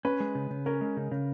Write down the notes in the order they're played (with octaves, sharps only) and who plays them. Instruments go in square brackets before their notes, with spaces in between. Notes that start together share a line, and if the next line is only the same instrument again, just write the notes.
[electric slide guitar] C#4 [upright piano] B4
[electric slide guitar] G#3
C#3
C#3
[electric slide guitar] C#4 [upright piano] A#4
[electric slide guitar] G#3
C#3
C#3